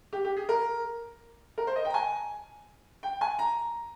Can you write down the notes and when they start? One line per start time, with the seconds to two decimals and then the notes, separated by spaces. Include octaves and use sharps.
0.13 G4
0.25 G4
0.37 G#4
0.49 A#4
1.58 A#4
1.67 C5
1.76 D#5
1.85 G5
1.90 A#5
1.94 G#5
3.03 G5
3.21 G#5
3.39 A#5